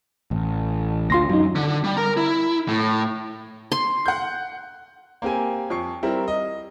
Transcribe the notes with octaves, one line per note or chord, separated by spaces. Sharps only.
A1
D2 F4 C6 A#6
F#2 F#3 D#4
D3
G3
A#4 A#5
E4
A2
C6
F#5 G6
A#3 C4 G4 G#5
F2 C#6 C7
G3 C4 E4 A#4 E5
D#5